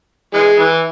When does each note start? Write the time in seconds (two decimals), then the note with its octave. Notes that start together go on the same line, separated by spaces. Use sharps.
0.34 E3 G#3
0.58 E3